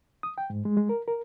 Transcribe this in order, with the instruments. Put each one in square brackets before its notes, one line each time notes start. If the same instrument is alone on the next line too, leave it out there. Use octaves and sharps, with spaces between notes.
[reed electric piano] D#6
G5
G#2
G#3
G#3
A#4
A#4